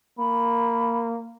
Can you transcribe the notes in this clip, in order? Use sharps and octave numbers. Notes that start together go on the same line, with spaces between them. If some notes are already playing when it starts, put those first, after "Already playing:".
A#3 B5